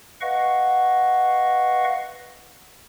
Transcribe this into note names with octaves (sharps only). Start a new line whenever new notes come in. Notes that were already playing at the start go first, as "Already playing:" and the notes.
B4 D#5 F5 F#5 C#6